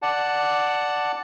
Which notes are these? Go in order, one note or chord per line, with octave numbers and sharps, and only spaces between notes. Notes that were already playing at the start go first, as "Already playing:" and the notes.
D5 F#5 A5